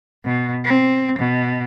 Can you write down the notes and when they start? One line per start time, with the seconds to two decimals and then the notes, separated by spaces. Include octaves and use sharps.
0.25 B2
0.64 C4
1.19 B2